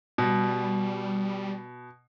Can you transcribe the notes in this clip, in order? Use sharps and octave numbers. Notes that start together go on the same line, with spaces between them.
B2 G3